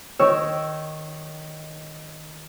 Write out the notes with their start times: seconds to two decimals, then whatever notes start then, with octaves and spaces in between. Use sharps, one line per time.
0.19 D#3 C#5 E6